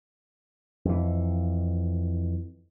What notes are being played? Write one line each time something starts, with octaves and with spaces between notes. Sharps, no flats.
F2 E3